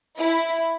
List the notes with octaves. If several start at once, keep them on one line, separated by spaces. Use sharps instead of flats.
E4